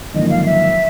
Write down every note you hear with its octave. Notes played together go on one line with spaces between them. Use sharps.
G#1 F#2 D3 F3 A#3 D#5
F5
E5